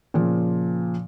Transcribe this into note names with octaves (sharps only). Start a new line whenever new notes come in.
A#2 C#3 F3